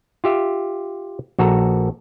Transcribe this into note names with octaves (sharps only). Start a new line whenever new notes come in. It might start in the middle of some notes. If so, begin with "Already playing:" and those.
F4 G4 E5
A#1 F#4 A4 A#5